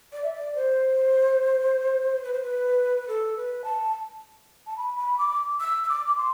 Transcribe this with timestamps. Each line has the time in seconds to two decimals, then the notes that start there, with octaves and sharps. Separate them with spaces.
0.13 D5
0.23 E5
0.33 D5
0.55 C5
2.23 B4
2.33 C5
2.43 B4
3.08 A4
3.37 B4
3.64 A5
4.67 A5
4.77 B5
4.97 B5
5.18 D6
5.60 E6
5.84 E6
5.89 D6
6.06 D6
6.17 C6